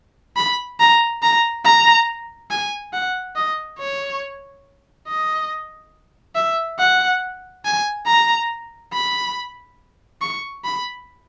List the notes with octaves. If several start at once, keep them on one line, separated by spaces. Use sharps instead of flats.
B5
A#5
A#5
A#5
G#5
F#5
D#5
C#5
D#5
E5
F#5
G#5
A#5
B5
C#6
B5